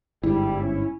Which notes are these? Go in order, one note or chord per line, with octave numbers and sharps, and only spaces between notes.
G1 G#2 G3 E4
C#4